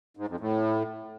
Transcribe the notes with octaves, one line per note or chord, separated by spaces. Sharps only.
G#2
F2
A2